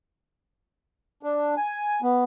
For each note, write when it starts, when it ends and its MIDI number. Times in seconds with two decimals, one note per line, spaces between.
1.23 1.55 62
1.57 2.01 80
2.02 2.24 59